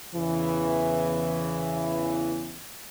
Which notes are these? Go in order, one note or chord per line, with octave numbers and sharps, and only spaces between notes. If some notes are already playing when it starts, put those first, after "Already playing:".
E2 C#3 E3